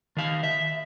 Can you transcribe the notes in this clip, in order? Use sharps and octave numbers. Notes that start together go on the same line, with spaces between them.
D#3 F5
E5